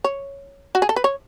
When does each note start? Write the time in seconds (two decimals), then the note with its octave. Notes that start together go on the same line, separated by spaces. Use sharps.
0.04 C#5
0.75 F#4
0.82 G#4
0.89 A4
0.96 B4
1.04 C#5